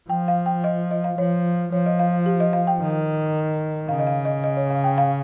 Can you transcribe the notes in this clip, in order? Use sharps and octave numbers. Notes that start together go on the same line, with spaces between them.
F3 G5
F5
G5
D#5
D#5
F5
F3 C#5
F3 C#5
D#5
F5
F5
G4
D#5
F5
G5
D#3
C#3 F5
D#5
F5
D#5
D#5
C#5
F5
G5
F5